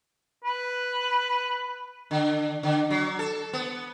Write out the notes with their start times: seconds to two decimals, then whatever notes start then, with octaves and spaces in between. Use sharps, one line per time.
0.45 B4
2.11 D3
2.63 D3
2.91 F#3
3.19 A4
3.53 B3